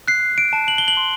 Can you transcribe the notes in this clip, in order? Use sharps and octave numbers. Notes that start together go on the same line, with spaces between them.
F#6 C7
D7
A5
F#7
G7
F#7
C6